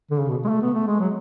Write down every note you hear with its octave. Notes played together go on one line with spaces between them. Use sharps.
D3
C#3
B2
G#3
A3
B3
A3
G#3
F#3